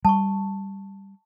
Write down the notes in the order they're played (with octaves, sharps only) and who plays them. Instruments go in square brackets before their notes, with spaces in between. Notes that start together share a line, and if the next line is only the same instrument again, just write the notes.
[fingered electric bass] G3 [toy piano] A5 C#6